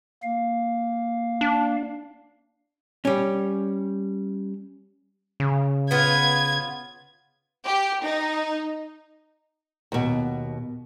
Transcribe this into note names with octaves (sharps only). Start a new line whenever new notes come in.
A#3 F5
D4
G3 C#4
C#3
B3 F4 G#6
G4
D#4
D#2 B2